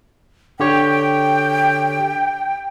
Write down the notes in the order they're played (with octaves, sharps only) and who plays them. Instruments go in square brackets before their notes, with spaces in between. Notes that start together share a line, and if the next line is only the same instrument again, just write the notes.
[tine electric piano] D3 G4 C#5 [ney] G5